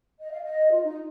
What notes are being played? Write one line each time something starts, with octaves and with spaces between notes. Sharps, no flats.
D#5
F5
D#5
F4
D#4